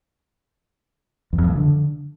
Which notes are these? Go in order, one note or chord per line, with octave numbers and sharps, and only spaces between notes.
E2
F2
F3
E3
D3